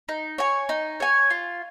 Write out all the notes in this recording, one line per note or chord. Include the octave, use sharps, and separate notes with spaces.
D#4
C#5 G#5
D#4
C#5 G#5
F4